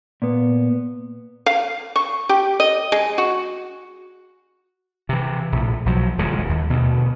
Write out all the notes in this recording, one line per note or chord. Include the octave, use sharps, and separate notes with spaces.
A#2 B3
F5
C#6
G4
D#5
G#3
F#4
C3 E3
A#1 A2
B1 F3 F#3
D#1 E2 C#3 G#3
D#2
D2 B2